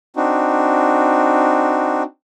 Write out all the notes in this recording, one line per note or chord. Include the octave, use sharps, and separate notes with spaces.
C4 D4 D#4 F#4